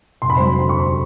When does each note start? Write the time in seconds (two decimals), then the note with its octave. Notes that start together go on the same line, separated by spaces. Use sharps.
0.22 F1 C6
0.30 B5
0.37 F#3 C5 C6
0.59 D3 C6
0.69 C#6
0.78 D#2 C5 C6